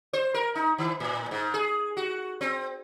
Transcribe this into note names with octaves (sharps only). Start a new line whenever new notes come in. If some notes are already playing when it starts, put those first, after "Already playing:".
C5
A#4
D#4
D#3
A2
G#2
G#4
F#4
C4